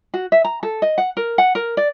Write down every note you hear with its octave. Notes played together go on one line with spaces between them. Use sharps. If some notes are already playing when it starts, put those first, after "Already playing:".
F#4
E5
A#5
A4
D#5
F#5
A#4
F#5
A#4
D5